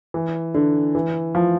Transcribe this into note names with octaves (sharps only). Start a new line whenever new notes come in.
E3
D3
E3
F3